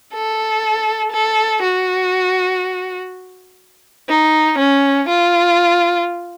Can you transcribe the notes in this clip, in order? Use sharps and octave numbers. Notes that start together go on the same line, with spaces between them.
A4
A4
F#4
D#4
C#4
F4